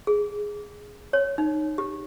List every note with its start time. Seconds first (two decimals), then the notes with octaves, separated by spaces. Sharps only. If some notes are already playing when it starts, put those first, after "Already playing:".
0.07 G#4
1.13 C#5
1.38 D#4
1.78 G4